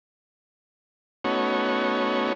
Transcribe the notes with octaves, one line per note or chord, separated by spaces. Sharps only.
A3 B3 C#4 D#4 F#4 C#5